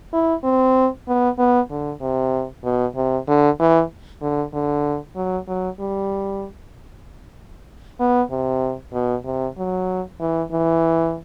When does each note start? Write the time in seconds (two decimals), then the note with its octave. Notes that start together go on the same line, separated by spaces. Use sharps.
0.13 E4
0.44 C4
1.08 B3
1.39 B3
1.70 D3
2.01 C3
2.64 B2
2.96 C3
3.28 D3
3.60 E3
4.22 D3
4.53 D3
5.16 F#3
5.48 F#3
5.80 G3
8.00 B3
8.31 C3
8.93 B2
9.25 C3
9.57 F#3
10.20 E3
10.51 E3